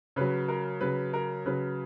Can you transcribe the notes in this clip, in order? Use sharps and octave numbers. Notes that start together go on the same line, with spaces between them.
C#3 F#3 B4
A#4
C#3 F#3 B4
A#4
C#3 F#3 B4